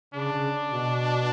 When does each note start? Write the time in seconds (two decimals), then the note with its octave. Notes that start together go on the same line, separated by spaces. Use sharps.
0.14 C#3 D4
0.33 C#3
0.70 B2